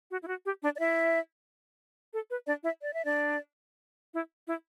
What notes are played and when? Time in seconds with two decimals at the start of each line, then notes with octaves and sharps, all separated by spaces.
0.11 F#4
0.22 E4
0.28 F#4
0.45 G4
0.61 D4 D5
0.74 D5
0.79 E4 E5
2.14 A4
2.29 B4
2.46 D4 D5
2.63 E4 E5
2.80 D5
2.92 E5
3.04 D4 D5
4.14 E4
4.48 E4